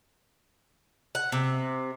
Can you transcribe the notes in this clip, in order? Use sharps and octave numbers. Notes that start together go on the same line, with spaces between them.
F#5
C3